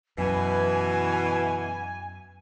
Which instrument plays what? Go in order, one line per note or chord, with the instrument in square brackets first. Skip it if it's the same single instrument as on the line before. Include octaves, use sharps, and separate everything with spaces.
[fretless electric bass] F#2 [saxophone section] B2 E3 [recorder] G#5